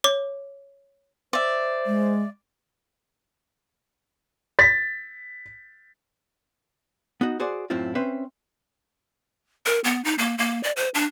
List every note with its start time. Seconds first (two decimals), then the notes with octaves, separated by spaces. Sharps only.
0.04 C#5 D6
1.33 C5 D5 E5
1.86 G#3
4.59 A6 B6
7.21 B3 D#4 F#4
7.40 F#4 G#4 C5 D5 F#5
7.70 F#2 A2 C4 E4 F4
7.95 C4 C#4 B4 C5 E5
9.66 A#4
9.84 B3
10.04 D#4
10.18 A#3
10.38 A#3
10.63 D5
10.76 C5
10.94 D4